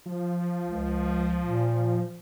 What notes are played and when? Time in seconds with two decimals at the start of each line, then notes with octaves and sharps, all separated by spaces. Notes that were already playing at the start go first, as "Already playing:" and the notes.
0.06 F3
0.64 C#2
1.44 A#2